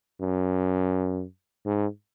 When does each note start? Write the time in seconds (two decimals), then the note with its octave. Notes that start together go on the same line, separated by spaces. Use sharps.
0.21 F#2
1.66 G#2